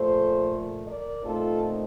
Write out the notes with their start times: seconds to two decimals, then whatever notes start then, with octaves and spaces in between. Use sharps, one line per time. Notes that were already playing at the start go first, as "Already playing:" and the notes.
Already playing: A#2 F3 A3 A4 C5
0.87 A#4 D5
1.23 A#2 A3 C4 D#4 F4 A4